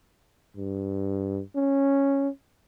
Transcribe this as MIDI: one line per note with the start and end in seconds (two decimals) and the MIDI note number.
0.57 1.42 43
1.56 2.28 61